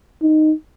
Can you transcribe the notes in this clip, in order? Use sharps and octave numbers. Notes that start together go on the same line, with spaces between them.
D#4